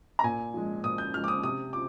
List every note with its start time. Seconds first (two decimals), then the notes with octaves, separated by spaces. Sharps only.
0.19 A#5
0.23 A#2 G#5
0.54 F3 G#3
0.84 A#2 D#6
0.98 G6
1.14 F3 G#3 F6
1.24 D6
1.28 D#6
1.43 C3 D#6
1.73 F4 D6